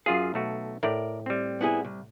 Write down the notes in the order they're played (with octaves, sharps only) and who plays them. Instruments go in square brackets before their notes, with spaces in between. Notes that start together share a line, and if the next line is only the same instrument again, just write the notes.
[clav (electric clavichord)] F#2 F4 G#4 [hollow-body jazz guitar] F5
[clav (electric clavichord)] B1 A3 F#4
[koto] A2 [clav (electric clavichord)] A#4 D5
[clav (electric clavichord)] G3 C4
[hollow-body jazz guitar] B3 E4 G#4
C2